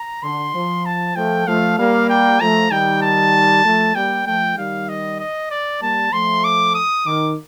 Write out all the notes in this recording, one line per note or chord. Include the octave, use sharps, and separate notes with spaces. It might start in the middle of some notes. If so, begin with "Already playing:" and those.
Already playing: A#5
D3 C6
F3
A5
F3 A3 G5
F3 A3 F5
G3 A#3 F5
G5
F3 A3 A#5
D#3 G3 G5
A5
F3 A3
G3 A#3 G5
F3 A3 G5
D#3 G3 F5
D#5
D#5
D5
G3 A#3 A5
F3 A3 C6
D6
D#6
D#3 D6